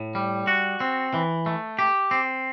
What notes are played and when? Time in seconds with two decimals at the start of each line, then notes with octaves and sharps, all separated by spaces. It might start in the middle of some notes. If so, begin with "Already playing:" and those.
Already playing: A2
0.15 G3
0.47 F#4
0.80 C4
1.14 E3
1.46 A3
1.79 G4
2.11 C4